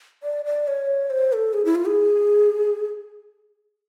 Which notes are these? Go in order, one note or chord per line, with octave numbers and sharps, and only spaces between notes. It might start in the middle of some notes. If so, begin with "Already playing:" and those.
D5
D5
C#5
C5
A4
G#4
E4
F4
G#4